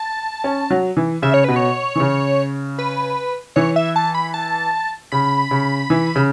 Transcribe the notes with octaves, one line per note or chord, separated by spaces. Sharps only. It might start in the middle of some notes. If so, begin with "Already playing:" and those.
Already playing: A5
C#4
F#3
E3
C#3 E5
C#5
B2 B4
C#5
E3
C#3
B4
E3 C#5
E5
A5
B5
A5
C#3 B5
C#3
E3
C#3